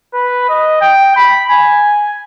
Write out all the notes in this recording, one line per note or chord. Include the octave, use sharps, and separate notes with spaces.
B4
D#5
G5
B5
G#5